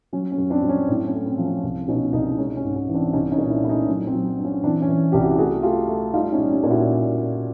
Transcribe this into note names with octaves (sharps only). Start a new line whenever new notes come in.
F#3 C#4
C#4
F#2
C4 D4
F#3
C#4
A2 C4 D4
C#4
A3
C4
F3
C#4
C2
B2 C#4 D#4
C2 C#4 D#4
G#3 C#4
C#4
G#2
C#4
E3
C4 D4
C2 C#4 D#4
C#4 D#4
A#2
D4 E4
A3 E4
C#4 D#4
F#3 C#4
C4
F#3
G2
C#4
E3 C4 D4
C#4
E3
C2 G4
E4 F#4
A3 F#4 G#4
A3 F4 G4
A3
G3 D#4 F4
C#4 D#4
G3
C#4
A#2
E4 F#4